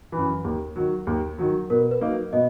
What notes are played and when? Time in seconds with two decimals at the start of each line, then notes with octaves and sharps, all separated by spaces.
0.12 F#2 E3
0.44 D#2
0.76 D#3 F#3
1.07 D#2
1.39 D#3 F#3
1.70 B2 A#4
1.91 B4
2.01 F#3 A#3 D#4
2.33 B2 D#5